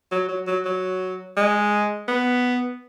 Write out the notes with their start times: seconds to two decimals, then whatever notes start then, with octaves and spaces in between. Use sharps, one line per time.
0.12 F#3
0.28 F#3
0.47 F#3
0.65 F#3
1.37 G#3
2.08 B3